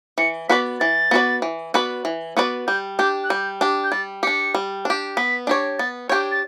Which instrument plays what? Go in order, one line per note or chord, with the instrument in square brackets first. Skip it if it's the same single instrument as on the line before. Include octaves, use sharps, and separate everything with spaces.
[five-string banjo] E3 [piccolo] C#7
[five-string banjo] B3 F#4 B4 D5 [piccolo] B6
[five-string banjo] E3 [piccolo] A6
[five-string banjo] B3 F#4 B4 D5
E3
B3 F#4 B4 D5
E3
B3 F#4 B4 D5
[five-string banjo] G3 [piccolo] G6
[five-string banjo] D4 G4 [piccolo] G6
[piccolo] F#6
[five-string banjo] G3 [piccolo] G6
[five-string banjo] D4 G4
[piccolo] G6
[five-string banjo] G3 [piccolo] A6
[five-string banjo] D4 G4 [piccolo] C#7
[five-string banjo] G3
D4 G4
[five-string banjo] B3 [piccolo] B6
[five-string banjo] D4 G4 C#5
[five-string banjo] B3 [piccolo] A6
[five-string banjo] D4 G4 C#5 [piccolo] G6
[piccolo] A6